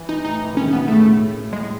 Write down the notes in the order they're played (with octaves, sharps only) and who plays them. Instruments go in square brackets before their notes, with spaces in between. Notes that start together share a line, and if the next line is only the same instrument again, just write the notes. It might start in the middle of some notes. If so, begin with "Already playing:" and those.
Already playing: [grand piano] E3
[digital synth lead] D#4
[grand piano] A2 [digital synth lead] D#4
[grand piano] E3
[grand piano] D#3 [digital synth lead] C#4
[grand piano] C#3
[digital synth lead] B3
[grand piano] B2
[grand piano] A2 [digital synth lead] A3
[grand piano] A2 [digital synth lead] G#3